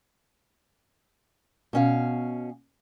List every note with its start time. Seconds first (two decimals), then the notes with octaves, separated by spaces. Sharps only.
1.73 B2 C#4 F5